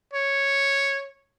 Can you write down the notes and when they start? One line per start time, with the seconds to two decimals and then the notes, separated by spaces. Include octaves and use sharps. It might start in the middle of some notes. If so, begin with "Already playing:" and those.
0.13 C#5